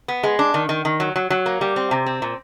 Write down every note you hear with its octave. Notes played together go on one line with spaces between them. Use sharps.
B3
G#3
D4
D#3
D#3
D#3
F#3
F#3
F#3
A#3
G3
C4
C3
C4
A#2